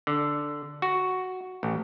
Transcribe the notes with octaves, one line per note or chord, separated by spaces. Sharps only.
D3
F#4
A1